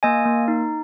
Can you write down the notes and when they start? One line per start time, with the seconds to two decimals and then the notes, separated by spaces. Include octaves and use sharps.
0.03 A#3 D#5 G#5
0.25 A#3
0.48 D#4